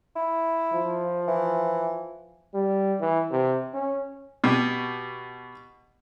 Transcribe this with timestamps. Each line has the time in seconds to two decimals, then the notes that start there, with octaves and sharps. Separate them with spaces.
0.16 E4
0.73 F3
1.28 E3
2.54 G3
3.00 E3
3.31 C3
3.74 C#4
4.44 B2 G4